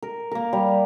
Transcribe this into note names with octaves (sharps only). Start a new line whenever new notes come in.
A#4
A#3 A#4
G3